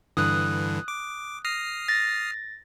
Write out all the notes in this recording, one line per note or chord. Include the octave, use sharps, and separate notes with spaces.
G2 D3 E3 D#6 F#6
D6
D#6 F6 A#6 C7
A6 A#6